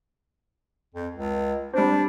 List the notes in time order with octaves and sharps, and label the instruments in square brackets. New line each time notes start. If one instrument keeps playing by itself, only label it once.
[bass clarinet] F2
C#2
[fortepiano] G3 C4 [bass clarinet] D4